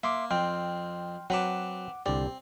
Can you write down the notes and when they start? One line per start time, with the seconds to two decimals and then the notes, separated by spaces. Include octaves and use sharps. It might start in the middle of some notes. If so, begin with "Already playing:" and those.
0.03 A#3 E5 C6 D6
0.31 F2 C4 G5 C6 F6
1.30 F#3 C4 B4 F#5 A5 D6
2.06 C2 D3 C4 G4 D5